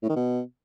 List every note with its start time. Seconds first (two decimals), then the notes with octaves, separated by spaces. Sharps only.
0.03 A2
0.09 D#3
0.16 B2